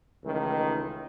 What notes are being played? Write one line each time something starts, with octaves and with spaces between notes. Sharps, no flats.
C#2 D#3 E3 A3